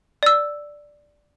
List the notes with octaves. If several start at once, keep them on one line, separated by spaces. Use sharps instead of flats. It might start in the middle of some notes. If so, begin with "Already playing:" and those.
D5 E6